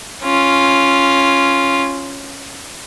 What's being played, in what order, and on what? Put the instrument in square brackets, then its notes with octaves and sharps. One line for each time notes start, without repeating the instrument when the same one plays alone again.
[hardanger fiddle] C#4 F4